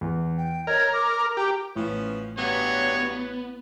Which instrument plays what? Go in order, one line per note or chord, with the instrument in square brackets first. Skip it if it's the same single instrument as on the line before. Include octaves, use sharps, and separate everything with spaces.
[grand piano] E2
[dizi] G5
[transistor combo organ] A#4 [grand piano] C#5 D#5 [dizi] G#6
[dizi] D6
[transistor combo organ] G4 [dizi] A#5
[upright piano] A1 [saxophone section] F3 B3 C#4
[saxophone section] G2 D3 F#3 [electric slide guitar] B3 [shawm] C#5